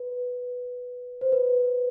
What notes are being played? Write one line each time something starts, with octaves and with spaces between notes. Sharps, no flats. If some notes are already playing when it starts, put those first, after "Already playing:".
Already playing: B4
C5
B4